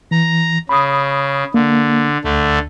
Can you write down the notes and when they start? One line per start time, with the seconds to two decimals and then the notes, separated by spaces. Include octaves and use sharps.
0.11 E3 A#5
0.69 C#3 B5 D#6
1.54 D3 A#3
2.24 D2 D3 A3